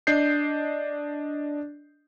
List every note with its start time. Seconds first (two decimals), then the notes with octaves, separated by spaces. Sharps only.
0.07 D4 D#5 G6 C7